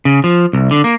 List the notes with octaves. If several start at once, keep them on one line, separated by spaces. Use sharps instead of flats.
C#3
F3
C2
D3
A#3